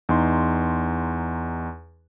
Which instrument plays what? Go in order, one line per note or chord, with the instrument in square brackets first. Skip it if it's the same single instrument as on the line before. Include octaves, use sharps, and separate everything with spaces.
[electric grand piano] E2 D#4 C6